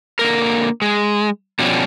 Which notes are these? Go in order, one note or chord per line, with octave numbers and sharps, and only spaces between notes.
D3 A#3 A#4
G#3
B2 F3 G3 C#4 D4